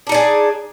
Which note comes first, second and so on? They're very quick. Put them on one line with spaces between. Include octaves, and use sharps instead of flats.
D4 D#4 D5 G#4